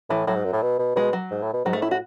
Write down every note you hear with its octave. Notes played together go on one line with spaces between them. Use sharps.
A2 E3
A2 F#3
G#2
F#2
A2
B2
B2
B2 G#3
F#3
G#2
A2
B2
G#2 F#3
A3
A2 E4
F#4